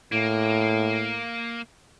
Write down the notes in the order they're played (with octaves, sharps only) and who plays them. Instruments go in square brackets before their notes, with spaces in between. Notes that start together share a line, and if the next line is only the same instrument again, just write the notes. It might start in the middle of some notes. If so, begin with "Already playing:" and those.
[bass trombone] A2 [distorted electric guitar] A#3